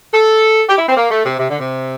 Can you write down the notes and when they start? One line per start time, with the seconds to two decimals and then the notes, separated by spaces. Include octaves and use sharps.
0.13 A4
0.70 G4
0.78 E4
0.88 C4
0.97 A#3
1.11 A3
1.26 C3
1.39 C3
1.50 D3
1.60 C3